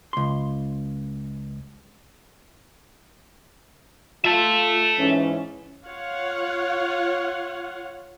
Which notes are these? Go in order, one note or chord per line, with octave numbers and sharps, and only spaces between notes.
C#2 C6
F4 E5 A5
G#2 E3 C#4
F4 C#5 F5 F#5